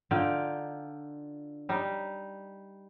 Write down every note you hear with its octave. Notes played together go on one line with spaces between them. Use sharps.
D3 D#4 F4 G5
G3 D#4